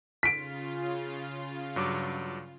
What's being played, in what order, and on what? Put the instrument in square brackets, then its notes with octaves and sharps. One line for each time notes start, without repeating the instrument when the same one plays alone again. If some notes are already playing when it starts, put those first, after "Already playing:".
[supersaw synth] C#3 F4 [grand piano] B6 D7
[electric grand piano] G2 F#3 D6